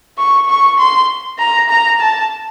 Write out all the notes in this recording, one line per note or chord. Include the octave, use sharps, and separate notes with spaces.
C#6
C#6
C6
A#5
A#5
A5